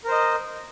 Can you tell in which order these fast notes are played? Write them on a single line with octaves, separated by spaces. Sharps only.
A#4 C5 D#5